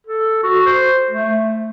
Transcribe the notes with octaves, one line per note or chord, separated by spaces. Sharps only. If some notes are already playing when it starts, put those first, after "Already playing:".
A4
F#4
C5
A3